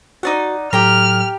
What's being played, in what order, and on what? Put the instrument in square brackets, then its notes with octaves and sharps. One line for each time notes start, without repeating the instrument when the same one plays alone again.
[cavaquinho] D#4 D5 F#5 [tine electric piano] F#4
[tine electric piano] A2 F#3 A4 [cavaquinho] G4 A#5 [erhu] F6